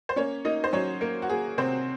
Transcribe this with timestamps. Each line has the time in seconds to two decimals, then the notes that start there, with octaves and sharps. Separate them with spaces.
0.09 C5
0.16 A#3 C#4 C#5
0.45 A#3 D#4 D#5
0.64 C5
0.73 F#3 C#4 C#5
1.01 A#3 A#4
1.22 F#4
1.29 A#3 G#4
1.58 C3 C4 C5